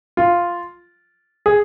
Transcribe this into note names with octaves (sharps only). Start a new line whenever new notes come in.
F4
G#4